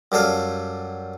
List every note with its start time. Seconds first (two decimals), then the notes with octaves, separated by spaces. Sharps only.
0.12 F#2 G3 A4 F5